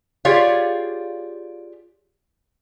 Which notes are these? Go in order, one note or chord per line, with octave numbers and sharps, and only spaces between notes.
F4 G4 G#4 C#5 D5 F5